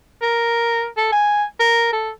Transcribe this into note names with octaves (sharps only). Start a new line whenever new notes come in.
A#4
A4
G#5
A#4
A4